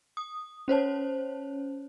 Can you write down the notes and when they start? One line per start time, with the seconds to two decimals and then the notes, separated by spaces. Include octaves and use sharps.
0.17 D#6
0.68 C#4 C5 C#5 A5